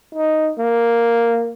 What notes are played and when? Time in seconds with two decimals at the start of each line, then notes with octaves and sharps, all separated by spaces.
0.14 D#4
0.58 A#3